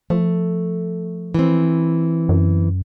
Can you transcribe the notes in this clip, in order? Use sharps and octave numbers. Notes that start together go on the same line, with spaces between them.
F3 A3
E3 C4
F#2